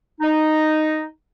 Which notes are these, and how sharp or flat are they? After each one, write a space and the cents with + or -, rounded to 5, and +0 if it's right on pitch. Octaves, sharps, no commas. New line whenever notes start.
D#4 -5